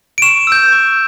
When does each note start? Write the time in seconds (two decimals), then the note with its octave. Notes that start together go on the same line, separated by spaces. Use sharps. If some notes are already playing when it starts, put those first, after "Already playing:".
0.18 D7
0.22 C#6 E7
0.47 E6 G6
0.72 C#6